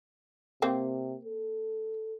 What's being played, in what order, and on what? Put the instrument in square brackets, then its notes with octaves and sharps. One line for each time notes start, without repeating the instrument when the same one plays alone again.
[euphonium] C3 [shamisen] A#3 C4 G5
[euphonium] A4